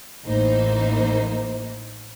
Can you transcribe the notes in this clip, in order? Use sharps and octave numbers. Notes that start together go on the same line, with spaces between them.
A1 E3 A#3 D#4 C5